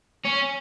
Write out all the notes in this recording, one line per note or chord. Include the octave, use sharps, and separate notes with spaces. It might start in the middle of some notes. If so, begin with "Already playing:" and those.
C#4